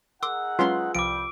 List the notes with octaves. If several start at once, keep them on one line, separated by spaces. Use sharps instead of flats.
D#4 G#4 A#4 F#5 C6 D6 E6
F#3 G#3 C#4 F4 B4 C6
C2 F3 G3 D6 D7